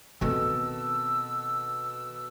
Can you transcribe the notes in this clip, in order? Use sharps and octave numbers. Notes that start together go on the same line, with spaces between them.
B2 D#3 C4 A4 E6